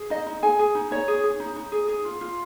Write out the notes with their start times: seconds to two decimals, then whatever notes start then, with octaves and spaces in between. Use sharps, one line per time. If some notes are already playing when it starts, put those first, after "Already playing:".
Already playing: G#4
0.10 D#4 D#5
0.27 D#4
0.42 G#4 G#5
0.59 G#4
0.75 D#4
0.91 D#4 C#5
1.08 G#4
1.24 G#4
1.40 D#4
1.56 D#4
1.72 G#4
1.88 G#4
2.05 F4
2.21 F4